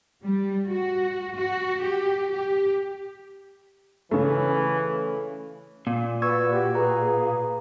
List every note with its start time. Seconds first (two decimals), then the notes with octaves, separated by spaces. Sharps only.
0.23 G3
0.68 F#4
1.35 F#4
1.81 G4
2.31 G4
4.11 C#3 E3 A3
5.87 A#2
6.22 F#4 B4 D5 C#6 E6 G#6
6.51 F#4 G4
6.75 G#4 B4 A#5